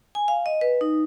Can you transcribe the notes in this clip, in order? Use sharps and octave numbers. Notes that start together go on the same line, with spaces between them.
G#5
F5
D#5
B4
D#4